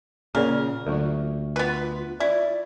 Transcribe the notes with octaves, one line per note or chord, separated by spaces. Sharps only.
A#2 C#3 A#3 A#4 D5
D2 D3 F#3 F4
B3 F4 B4 B5
E4 F4 D5